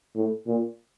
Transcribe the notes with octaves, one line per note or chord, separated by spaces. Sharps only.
A2
A#2